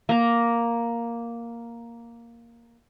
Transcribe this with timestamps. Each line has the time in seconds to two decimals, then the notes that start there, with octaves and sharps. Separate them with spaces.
0.09 A#3 A#5